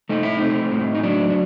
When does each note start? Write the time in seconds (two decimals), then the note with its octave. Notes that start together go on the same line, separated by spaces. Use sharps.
0.09 A3 D#4
0.23 E4
0.37 C4 D#4
0.72 A2
0.95 D#4
1.03 F#3 D4
1.30 D4